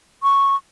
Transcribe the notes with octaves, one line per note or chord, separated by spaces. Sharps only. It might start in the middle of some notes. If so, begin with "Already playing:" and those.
C#6